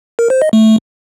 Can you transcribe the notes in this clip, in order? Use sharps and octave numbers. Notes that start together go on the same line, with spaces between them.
A#4
C5
D#5
A3